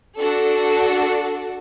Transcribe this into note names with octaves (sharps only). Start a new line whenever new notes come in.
D4 F#4 A4